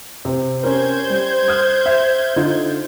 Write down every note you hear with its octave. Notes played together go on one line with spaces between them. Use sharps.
C3 C4
C#4 G4 A#4 C5 G6 G#6
G3
D#6 F6 F#6
E5
D3 D#4 F4